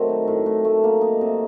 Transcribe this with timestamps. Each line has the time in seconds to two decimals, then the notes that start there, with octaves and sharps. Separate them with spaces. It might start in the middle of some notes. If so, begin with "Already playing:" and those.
Already playing: D#3 F#3 A3 C4
0.09 D#4
0.28 A2
0.46 A2
0.65 A3
0.84 A#3
1.01 D#4
1.21 C3